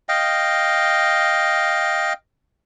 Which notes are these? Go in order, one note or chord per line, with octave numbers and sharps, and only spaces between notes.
D#5 F5 G5